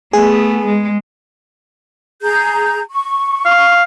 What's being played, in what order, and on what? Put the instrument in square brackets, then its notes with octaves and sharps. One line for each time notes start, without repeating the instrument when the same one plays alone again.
[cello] A3 B3 [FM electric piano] G#4
[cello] G#3
[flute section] G#4 A#5 G6
C#6
[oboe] F5